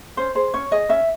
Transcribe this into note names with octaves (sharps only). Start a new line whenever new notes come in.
C#4 C5
G#4 C5
C#4 C#5
G#4 D#5
C#4 E5